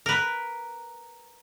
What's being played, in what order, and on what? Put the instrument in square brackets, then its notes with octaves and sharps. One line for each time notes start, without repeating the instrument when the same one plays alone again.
[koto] A#4 B4